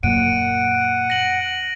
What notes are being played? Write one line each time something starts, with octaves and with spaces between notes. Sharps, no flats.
F#2 A#2 F#5 D7 D#7
A#6 F#7